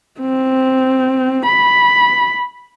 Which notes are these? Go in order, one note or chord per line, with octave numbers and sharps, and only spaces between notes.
C4
B5